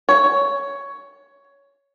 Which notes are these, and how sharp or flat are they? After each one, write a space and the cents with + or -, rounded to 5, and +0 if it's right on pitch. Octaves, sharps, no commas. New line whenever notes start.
C#5 +10